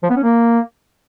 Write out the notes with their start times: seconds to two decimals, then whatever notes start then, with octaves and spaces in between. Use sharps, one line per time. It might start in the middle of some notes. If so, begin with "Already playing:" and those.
0.03 F3
0.10 B3
0.17 C#4
0.23 A#3